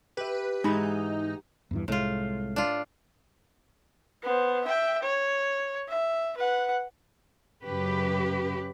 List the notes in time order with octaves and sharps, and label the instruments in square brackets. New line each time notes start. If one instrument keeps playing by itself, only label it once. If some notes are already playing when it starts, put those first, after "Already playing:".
[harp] G4 E5 [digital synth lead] B4
[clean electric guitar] G#2 E3 [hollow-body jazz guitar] G#3 B5 [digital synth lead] D#4
[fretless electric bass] E2 G2 E3
[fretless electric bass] C2 G#3 [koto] A2 F4
[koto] D4 F4
[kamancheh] B3 C5
E5 G5
C#5
E5
B4 F#5
[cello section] F#2 C#3 G4 B4